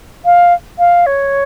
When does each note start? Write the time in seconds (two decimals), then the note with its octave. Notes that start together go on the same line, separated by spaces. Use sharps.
0.25 F5
0.78 F5
1.06 C#5